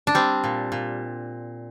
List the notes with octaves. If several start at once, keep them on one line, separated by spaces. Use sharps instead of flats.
D4
G3 C4
A#2
A#2